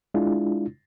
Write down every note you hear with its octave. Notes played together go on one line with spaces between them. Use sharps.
G#3 D4 E4 F4